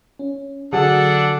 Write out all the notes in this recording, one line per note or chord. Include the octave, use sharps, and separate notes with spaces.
C#4
D3 F#3 D4 F#4 G#4 A4 F#5